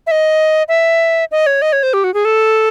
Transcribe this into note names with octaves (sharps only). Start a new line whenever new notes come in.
E5
D#5
E5
D#5
C#5
D#5
C#5
C5
G4
F#4
G#4
A4